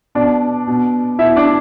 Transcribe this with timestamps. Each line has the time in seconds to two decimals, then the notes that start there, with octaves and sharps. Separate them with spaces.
0.15 B2 D4 D5
0.67 B2
1.19 B2 E4 E5
1.36 D4 D5